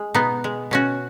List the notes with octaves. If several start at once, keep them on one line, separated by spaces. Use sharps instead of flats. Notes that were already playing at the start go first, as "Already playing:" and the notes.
Already playing: G#3
B2 B3 D#4
G#3
B2 C#4 F#4